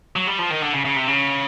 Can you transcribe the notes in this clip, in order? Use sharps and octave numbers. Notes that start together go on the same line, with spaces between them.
F#3
G3
F3
D#3
D3
C#3
C#3
C3
C#3